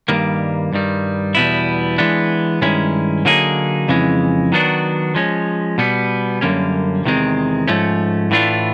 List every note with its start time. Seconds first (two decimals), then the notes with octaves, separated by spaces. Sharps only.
0.08 G2 D#3 G3 A#3
0.73 G2 D#3 G3
1.35 E2 B2 G3 B3 E4
1.98 E3 G#3 B3 D4
2.62 G2 D#3 G#3 C#4 E4
3.25 D3 F#3 A#3 D#4 G#4
3.88 F2 C#3 E3 G#3
4.52 D#3 F#3 B3 D4 F#4
5.15 F3 G#3 C#4
5.78 B2 G3 B3
6.41 F#2 D3 G3 A#3 C#4
7.04 E2 C3 D#3 G#3 C4
7.68 G#2 F3 A3 C#4
8.31 A2 E3 A3 D4 F4